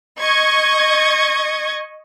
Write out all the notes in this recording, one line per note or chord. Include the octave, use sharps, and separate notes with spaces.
D#5 C#6 G#6